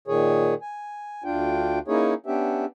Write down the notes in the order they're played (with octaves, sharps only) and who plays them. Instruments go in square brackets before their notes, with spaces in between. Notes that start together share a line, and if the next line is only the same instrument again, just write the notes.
[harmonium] A#2 D#3 G#4 C#5
G#5
D2 D4 F4 G5
A#3 C#4 D#4 E4 G#4 C#5
B3 C#4 D4 G4 E5